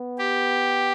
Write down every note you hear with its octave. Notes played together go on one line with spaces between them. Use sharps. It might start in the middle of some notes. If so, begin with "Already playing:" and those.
Already playing: B3
G4